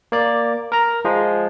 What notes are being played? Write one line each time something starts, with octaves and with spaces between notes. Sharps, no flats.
A#3 D5
A#4 A#5
F3 G#3